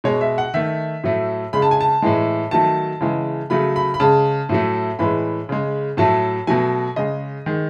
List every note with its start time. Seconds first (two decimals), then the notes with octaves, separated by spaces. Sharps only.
0.04 B2 G#3 C#5
0.21 E5
0.38 F#5
0.54 D#3 A3 E5
1.04 A2 F#3 A3
1.53 C#3 G#3 B5
1.62 A5
1.71 G#5
1.81 A5
2.02 A2 E3 G#3
2.51 D#3 F#3 A3 A5
3.01 C#3 E3 G#3
3.50 C#3 F#3 A3 B5
3.76 B5
3.94 B5
4.00 C#3 G#3 A5
4.49 A2 F#3 A3
4.99 A2 E3 G#3 B5
5.49 C#3 G#3
5.97 A2 F#3 A3 A5
6.47 B2 F#3 A3 G#5
6.96 C#3 G#3 D#5
7.46 D#3 G#3